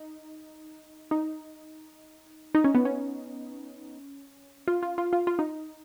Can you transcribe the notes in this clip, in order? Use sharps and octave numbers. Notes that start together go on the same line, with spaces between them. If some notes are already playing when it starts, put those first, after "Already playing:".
Already playing: D#4
D#4
D#4
C#4
B3
C#4
F4
F4
F4
F4
F4
D#4